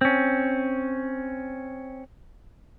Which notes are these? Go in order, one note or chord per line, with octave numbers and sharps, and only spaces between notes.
C4 C#4